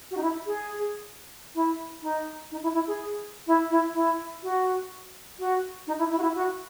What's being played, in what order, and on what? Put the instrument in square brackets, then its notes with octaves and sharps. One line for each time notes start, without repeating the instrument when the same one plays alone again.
[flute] F#4
D#4
E4
G#4
E4
D#4
D#4
E4
E4
G#4
E4
E4
E4
F#4
F#4
D#4
E4
E4
F#4
E4
F#4